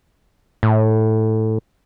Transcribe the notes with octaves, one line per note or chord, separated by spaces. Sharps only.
A2